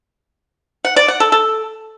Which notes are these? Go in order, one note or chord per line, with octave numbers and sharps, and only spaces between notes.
F#5
D5
F#5
A4
A4